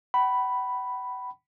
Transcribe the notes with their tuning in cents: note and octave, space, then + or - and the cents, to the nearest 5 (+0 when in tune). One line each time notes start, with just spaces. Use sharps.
F#5 +45 B5 +0